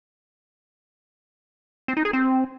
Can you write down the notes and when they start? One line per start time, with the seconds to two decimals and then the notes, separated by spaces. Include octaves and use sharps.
1.88 C4
1.97 D#4
2.05 G#4
2.13 C4